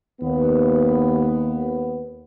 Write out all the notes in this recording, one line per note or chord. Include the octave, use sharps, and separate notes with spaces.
D#2 B3